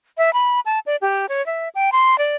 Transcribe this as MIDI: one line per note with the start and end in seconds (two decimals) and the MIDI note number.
0.18 0.33 76
0.33 0.60 83
0.66 0.79 81
0.86 0.96 74
1.02 1.26 67
1.29 1.44 73
1.46 1.69 76
1.75 1.90 79
1.92 2.18 84
2.18 2.36 74